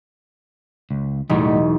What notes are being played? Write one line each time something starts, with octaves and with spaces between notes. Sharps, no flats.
C#2
E1 A2 F#3 G3 D#4